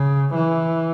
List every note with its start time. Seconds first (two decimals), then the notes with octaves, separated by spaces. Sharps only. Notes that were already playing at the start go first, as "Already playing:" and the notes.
Already playing: C#3
0.35 E3